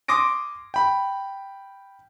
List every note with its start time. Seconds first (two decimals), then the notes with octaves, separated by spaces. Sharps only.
0.08 C6 D6 D#6 A#6 D7
0.74 G5 B5